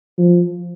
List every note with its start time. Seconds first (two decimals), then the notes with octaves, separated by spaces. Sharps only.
0.18 F3